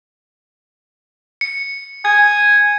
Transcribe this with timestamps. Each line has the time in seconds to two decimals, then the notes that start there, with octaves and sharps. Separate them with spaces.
1.41 C#7
2.05 G#5 G#6